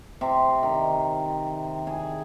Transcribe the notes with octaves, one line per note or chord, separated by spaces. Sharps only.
C3
D#3
G#4